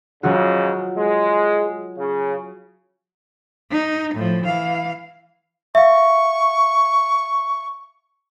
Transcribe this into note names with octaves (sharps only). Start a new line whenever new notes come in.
G#2 C#3 F#3 F4 F#4
G#3
C#3
D#4
A2 F3
E3 F5
E5 F5 C#6